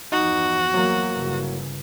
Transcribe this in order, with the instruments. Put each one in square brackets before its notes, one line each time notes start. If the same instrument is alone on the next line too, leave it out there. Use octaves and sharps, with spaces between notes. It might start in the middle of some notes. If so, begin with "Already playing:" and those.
[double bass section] E2 G2 F3 [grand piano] D#4 [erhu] F#4
[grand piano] F#3 A#3
[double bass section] G1 C#3 E3